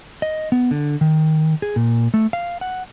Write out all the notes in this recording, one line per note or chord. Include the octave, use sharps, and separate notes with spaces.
D#5
B3
D3
D#3
G#4
A#2
A3
F5
F#5